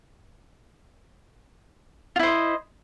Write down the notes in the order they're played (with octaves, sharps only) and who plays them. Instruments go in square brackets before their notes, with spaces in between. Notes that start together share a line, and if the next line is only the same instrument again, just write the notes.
[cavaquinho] F4
E4
C5
D#5